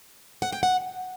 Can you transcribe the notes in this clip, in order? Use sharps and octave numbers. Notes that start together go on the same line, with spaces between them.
F#5
G5
F#5